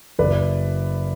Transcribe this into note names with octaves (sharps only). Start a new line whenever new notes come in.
F#1 B4 D5